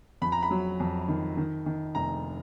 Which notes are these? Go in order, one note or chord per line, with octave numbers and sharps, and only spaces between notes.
F2 B5
A#5
B5
F#3
F2
D#3
D#3
D#3
F1 A#5